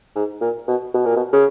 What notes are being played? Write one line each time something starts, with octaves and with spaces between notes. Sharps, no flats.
G#2
A#2
B2
B2
A#2
B2
C#3